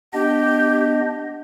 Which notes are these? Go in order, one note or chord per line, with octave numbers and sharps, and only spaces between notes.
B3 D4 G4 D#5